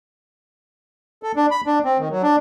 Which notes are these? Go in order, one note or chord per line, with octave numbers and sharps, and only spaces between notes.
A4
D4
B5
D4
C4
D#3
F#3
D4